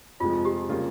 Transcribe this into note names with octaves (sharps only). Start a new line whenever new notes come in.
F2 C3 F3 G#3 F4
G4
C#3 G3 A#3 F4